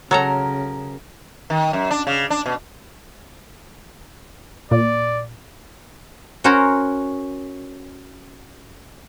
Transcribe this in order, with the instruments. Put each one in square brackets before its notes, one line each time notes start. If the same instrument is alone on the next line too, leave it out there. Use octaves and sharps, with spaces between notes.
[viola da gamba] C#3 [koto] F#3 A4 A#5 [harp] A#4
[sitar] D#3
F#2
D4
C#3
D4
B2
[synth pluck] A#2 [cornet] D5
[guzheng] C#4 F#4 A#4 C5 C#5